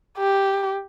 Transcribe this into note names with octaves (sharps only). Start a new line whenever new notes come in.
G4